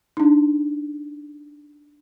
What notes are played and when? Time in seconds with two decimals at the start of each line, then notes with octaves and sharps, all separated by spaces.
0.17 D4 D#4